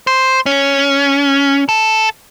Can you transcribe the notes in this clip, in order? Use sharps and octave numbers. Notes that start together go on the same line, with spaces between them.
C5
C#4
A4